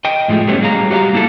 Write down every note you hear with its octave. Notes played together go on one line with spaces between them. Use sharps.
D#5 G5
A2 F3 G#3 A3
F#3 G3 A3 B3 C#4
F#3 G3 G#4 F5 A#5
F#4 G4 B4 D#5 F5 A#5
G3 A#3 E4 F#4 A4